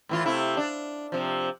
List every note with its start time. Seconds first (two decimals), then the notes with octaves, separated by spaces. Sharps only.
0.09 A2 E3 F4
0.26 C3 A3 E4
0.57 D4
1.12 C3 F3